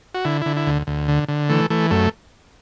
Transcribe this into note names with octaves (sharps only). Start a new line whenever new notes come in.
F#4
D3 E4
D3 E4
E4
D2
D2
D3
D3
E3 A3
E3 A3
F#2 A3